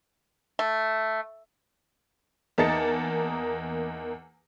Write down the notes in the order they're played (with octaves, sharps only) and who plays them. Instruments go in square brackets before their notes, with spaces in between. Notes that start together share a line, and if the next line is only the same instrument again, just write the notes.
[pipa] A3
[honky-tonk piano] E2 A#3 D#4 A5 A6 C#7